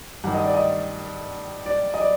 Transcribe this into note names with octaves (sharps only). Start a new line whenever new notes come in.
G2 D#3 F#5
D#5
D5
D#5
D5
D#5
D5